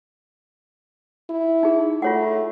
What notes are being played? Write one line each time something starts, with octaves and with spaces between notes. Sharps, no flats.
E4
D#4 G#4
A3 F4 C#5 F#5